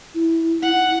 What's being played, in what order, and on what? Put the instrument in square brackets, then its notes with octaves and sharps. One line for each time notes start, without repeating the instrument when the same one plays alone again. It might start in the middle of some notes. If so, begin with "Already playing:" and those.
[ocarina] E4
[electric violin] F#5